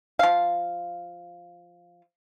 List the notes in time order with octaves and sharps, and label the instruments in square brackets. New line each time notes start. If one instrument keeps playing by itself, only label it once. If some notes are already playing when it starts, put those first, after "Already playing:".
[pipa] F3 F5